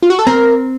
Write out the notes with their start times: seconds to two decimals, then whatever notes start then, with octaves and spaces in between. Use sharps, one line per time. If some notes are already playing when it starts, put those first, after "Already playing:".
0.02 F4
0.10 F#4
0.19 A4
0.27 C4 A#4